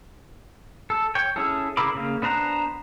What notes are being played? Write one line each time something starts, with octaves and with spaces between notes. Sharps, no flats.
A4
C#5 G5
C#4 E4 G#4 A4
C#3 E4 A#4 B5 D6
C#3 A#3
B3 D4 C5 A#5 F#6